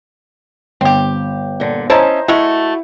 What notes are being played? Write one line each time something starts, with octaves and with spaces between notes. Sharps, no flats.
G1 C4 G4
A#2 D3
C#4 E4 C5 D#5 E5 A5 A#5
G#3 A3 E4 F#4